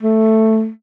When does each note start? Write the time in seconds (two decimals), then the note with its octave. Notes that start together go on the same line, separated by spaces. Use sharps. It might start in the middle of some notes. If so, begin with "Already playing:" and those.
0.03 A3